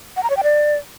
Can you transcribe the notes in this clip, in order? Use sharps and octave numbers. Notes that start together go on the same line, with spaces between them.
F#5
A#5
C#5
G5
D5